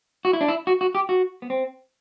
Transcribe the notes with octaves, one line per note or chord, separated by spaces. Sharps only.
F#4
E4
D4
E4
F#4
F#4
G4
F#4
B3
C4